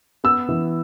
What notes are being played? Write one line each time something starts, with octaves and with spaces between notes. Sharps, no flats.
B3 E6
E3